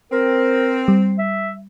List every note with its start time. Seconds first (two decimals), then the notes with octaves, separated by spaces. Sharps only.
0.12 C4 A#4
0.88 G3
1.19 E5